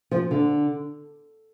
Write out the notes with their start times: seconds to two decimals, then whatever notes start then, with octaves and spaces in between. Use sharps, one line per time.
0.11 F3
0.31 D3